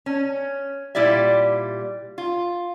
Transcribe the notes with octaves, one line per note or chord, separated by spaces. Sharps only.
C#4
A#2 G3 E4 G4 D5 E5
F4